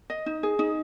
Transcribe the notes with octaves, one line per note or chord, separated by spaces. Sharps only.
D#5
D#4
G#4
D#4